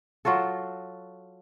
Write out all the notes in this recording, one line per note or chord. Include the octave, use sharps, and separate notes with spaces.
F#3 F4 F#4 A4